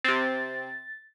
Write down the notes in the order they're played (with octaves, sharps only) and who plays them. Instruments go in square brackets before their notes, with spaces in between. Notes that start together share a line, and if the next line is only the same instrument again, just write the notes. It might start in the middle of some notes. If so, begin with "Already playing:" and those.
[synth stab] C3 C4 [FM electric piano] A6